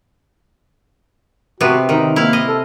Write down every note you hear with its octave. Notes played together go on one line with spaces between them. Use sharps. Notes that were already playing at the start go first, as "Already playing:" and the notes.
C3 B3 F#4
D#3 D#4
A#3 E4 F5
D#5
A4